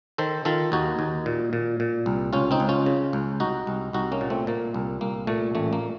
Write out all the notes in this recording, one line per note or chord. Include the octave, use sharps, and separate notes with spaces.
D#3 A4 C5
D#3 F4 A4
D#2 D#4 F#4
D#2
A#2
A#2
A#2
C2
C#2 C#4 F4
C4 D#4
C#2
C#4 F4
C#3
C#2
C2 D#4 F#4
C2
C2 D#4 F#4
A#3 C#4
A#2
A3 C4
A#2 A#3
C2
C2 A#3
A#2 A3
A1 A3
A#3